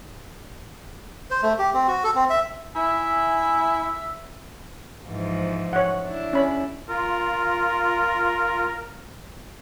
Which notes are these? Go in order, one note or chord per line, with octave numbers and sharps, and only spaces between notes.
C5
A3
G4
C4
F#4
A4
C4
E5
E4 E5 G#5
G#2 E3 F3
C#5 F#5
D4 E4
C#4 B5
F4 A#4